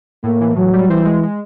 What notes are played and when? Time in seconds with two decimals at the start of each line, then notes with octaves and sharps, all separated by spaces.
0.24 A2 A#3
0.41 E3
0.56 A2 F#3
0.73 G3
0.90 E3 C4
1.05 G#3
1.23 G#3